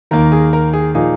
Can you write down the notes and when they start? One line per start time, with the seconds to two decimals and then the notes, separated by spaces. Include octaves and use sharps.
0.11 D#2 D#3 A#3 A#4
0.32 G#4
0.53 A#4
0.73 G#4
0.94 A#2 F3 A#3 D#4 G#4